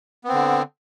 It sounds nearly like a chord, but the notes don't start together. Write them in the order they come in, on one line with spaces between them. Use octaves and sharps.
B3 C4 D3